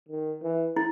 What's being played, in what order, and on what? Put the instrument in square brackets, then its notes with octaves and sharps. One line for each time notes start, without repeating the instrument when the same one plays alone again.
[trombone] D#3
E3
[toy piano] E4